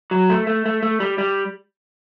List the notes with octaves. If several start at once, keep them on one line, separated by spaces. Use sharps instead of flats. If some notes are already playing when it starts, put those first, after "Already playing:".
F#3
A3
A3
A3
A3
G3
G3